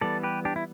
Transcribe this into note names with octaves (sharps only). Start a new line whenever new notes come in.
E3 G3 B3 A4 D5
G4 B4
D4 G4
E4